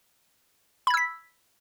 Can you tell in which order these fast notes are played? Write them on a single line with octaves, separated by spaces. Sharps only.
B5 G#6 E6 B6